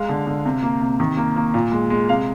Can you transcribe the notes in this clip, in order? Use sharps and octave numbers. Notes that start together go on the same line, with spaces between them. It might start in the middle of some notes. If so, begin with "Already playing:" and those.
Already playing: G#3 F5
D3
D3
C3
A#3
C3
D#3
A#3
A#3
A#2
G#3
G#3
C3 F5